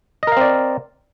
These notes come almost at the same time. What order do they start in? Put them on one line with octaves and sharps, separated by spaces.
D#5 A#4 F5 C4 D5